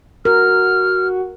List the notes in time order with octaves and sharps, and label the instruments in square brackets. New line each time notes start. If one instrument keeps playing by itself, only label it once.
[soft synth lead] F#4 [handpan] A#4 [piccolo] F6